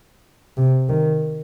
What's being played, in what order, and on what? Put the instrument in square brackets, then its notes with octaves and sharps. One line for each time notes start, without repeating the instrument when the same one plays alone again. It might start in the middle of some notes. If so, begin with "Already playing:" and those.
[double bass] C3
D#3